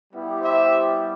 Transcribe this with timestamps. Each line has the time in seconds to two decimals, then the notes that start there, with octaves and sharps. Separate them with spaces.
0.13 G3 B3 E4 G4
0.41 C5 E5